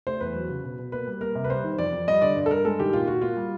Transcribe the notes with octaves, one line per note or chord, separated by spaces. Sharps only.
A3 C5
E2 B4
F#3
C#3
B2
B2
A#3 B4
G3
A#3 A#4
C3
B4
G3 C5
D#3
F2 D5
F2
G3 D#5
D3 D5
G2
A4
G2 A#4
G#3 A4
D#3 G4
A#2 F4
A#2 F#4
A#3 F4
G3